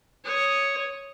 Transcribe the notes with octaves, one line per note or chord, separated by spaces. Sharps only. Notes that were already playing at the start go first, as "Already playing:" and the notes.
C#5 D#6